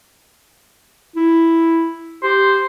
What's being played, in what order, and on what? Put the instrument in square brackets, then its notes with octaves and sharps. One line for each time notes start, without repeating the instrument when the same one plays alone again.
[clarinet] E4
[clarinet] G4 [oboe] C5